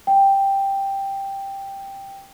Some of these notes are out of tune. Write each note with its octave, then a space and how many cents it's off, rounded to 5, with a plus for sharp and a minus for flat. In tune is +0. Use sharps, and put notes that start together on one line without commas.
G5 +5